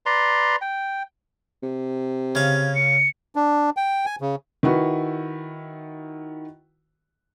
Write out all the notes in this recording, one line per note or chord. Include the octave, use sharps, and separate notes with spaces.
B4 D5 A#5 C6
G5
C3
C#3 F5 G#6
C#7
D4
G5
G#5
C#3
D#3 E4 F#4 B4